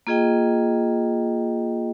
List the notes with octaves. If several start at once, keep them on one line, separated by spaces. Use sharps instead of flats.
A#3 F4 G#4 D#5 G5